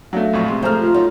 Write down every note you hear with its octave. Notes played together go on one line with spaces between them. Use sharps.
F#3 A3 D4 F5
A#1 F2 C#6
C3 G#3 C6
F3 A3 C5 A#5 F6
F4
F#3 D#4